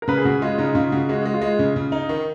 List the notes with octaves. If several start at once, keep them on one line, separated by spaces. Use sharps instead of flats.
A#4
C#3 B4
G#4
C#3 F#4
G#3 F4
C#3 D#4
C#3 F4
C#3 F#4
G#3 F#4
G#3
F4
G#3
C#3
C#3
D#4
D#3